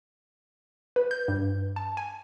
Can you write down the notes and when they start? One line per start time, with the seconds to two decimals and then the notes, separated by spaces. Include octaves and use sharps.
0.96 B4
1.11 G6
1.28 G2
1.76 A5
1.97 G#5